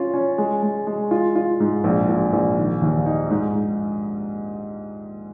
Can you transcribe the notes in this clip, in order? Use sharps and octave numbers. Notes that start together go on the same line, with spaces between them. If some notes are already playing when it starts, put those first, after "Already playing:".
Already playing: C#4 F4
C#4
G#3
G#3
G#3
F4
F4
G#2
A#1
A#1
A#1
D#3
D#2
D#4
G#2
G#2